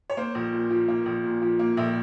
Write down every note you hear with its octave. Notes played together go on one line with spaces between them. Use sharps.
C#5
A#3 C5
A#1
A#2
F3
A#3
A#1
A#2
F3
A#3
A#1 E5